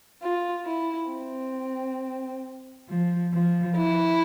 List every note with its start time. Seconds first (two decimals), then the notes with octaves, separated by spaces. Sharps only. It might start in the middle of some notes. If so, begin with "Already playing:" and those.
0.20 F4
0.65 E4
1.09 C4
2.88 F3
3.33 F3
3.77 E4